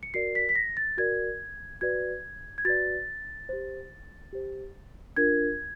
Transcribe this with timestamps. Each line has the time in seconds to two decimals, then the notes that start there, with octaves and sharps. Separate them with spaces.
0.03 C#7
0.14 F#4 A#4 D5 C7
0.35 B6
0.49 B6
0.55 A#6
0.77 A6
0.97 F#4 A#4 D5 G#6
1.81 F#4 B4 D5 G#6
2.58 G#6
2.65 F#4 B4 D5 A6
3.49 G4 C5
4.33 G4 C5
5.16 D4 F4 A#4 G#6